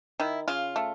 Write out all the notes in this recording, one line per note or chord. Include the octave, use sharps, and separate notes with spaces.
D#3 E4
C#3 F4
A3